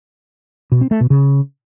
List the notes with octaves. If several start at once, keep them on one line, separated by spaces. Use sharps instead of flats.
B2
C4
A3
B2
C#3